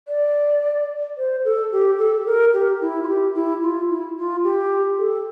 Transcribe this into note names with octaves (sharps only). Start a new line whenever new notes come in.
D5
C5
A4
G4
A4
A#4
G4
E4
F4
G4
E4
F4
E4
F4
G4
A4